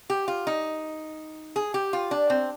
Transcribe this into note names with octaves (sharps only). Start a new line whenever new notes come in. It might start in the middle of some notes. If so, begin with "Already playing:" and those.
G4
F4
D#4
G#4
G4
F4
D4
C4